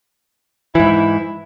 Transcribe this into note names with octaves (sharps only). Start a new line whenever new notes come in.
G#2 E3 E4